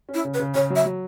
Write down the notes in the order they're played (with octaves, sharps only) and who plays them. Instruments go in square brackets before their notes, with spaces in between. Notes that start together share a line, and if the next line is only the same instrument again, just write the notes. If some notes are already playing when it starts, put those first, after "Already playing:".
[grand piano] C#4
[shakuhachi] E4
[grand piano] C#3
[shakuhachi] B4
[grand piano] C#3
[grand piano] C#3 [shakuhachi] C#5
[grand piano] F#3
[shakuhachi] E5
[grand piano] F#3